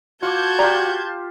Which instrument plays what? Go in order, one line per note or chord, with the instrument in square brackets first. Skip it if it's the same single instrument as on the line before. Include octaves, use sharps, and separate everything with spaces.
[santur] F4 D6 [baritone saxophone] F#4 [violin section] A5 G6 G#6
[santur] F4 G4 [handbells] D5 A#5